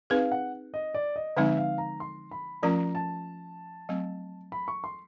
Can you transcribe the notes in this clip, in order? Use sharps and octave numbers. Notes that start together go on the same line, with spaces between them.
C4 D#4 G#4 B4 F5
F#5
D#5
D5
D#5
D3 F3 G#3 C4 D#4 E5
F5
A#5
C6
B5
F3 A3 C#4 F4 A#4 A#5
A5
F#3 A3 C4
B5
C#6
C6